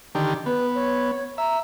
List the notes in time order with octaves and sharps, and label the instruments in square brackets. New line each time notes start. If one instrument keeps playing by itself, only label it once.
[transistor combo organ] D3 D#3 G4
[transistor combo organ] B3 [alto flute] B4
[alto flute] C#5
[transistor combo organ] E5 [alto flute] A#5